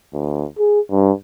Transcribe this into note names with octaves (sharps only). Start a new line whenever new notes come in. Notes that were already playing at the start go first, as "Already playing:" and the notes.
D2
G#4
G2